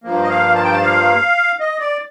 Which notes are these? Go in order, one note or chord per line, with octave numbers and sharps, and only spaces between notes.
G2 F3 A#3
D#5
F5
A5
G5
A5
F5
D#5
D5